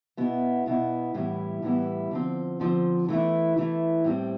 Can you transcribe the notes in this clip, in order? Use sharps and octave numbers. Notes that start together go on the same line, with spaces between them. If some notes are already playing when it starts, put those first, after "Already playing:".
B2 B3 E4
B2 B3 E4
A2 E3 G3 B3 E4
A2 E3 G3 B3 E4
D3 F3 C4
D3 F3 C4
E3 A3 E4
E3 A3 E4
A2 G3 C4